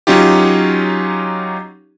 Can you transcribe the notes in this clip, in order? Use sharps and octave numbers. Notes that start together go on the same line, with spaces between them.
F#3 C#4 D#4 F4 G4